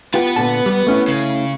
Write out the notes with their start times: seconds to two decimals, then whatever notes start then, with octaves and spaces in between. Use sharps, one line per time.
0.14 B3 F4 G4 B4
0.36 A#2 D3 A5
0.66 G3
0.87 A3 C#4 E4
1.08 C#3